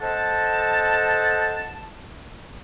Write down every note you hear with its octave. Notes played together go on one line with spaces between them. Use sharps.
A4 C5 D#5 F#5 A5